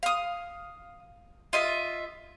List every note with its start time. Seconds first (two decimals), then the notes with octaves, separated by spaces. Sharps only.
0.03 F5 D#6
1.53 F4 D#5 E5